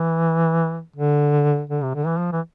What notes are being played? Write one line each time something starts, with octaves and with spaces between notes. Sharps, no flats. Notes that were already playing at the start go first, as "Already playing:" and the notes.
Already playing: E3
D3
D3
C3
D3
E3
F3
E3